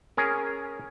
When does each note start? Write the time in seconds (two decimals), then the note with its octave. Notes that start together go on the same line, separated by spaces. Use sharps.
0.17 C#4 G#4 A#4